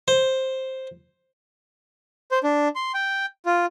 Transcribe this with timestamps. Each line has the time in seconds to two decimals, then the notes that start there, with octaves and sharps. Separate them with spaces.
0.08 C5
2.31 C5
2.43 D4
2.75 C6
2.94 G5
3.46 F4